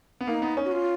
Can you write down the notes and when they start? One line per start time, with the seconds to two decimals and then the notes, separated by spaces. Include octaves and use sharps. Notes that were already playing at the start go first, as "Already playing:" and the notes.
0.21 B3
0.27 A#3 D#4
0.42 B3
0.57 C#4
0.65 F#4
0.72 F4